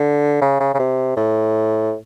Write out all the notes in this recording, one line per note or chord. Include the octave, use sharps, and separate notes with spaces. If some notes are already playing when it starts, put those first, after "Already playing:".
Already playing: D3
C#3
C#3
C#3
C3
A2